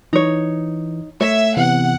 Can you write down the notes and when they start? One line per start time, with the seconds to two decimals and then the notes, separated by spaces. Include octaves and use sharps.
0.13 E3 D#4 C#5
1.21 A3 C#5 E5
1.57 C3 E3 B3 F#5